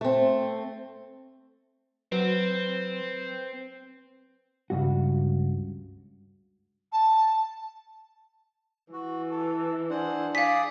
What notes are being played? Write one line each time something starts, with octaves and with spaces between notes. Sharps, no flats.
A3 C4
F#3 C4 B4
C#2 G2 F#4
A5
E3 F#4
A4
D4 G#4 C5 F#5
G#4 D5 F5 D#6 B6